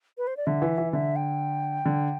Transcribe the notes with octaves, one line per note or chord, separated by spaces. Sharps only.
B4
C5
D5
D3 E5
E3
E3
D3 E5
G5
D3